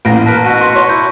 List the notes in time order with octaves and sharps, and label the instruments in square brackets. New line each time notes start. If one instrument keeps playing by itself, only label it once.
[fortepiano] A1 A#2 [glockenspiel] A#6 D7
[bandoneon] A#4 B4 [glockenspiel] A5 B6 D7
[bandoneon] B2 F#4 [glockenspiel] D#7
[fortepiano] C6
[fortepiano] C#5 [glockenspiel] C6 C#6
[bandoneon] E4 [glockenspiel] G6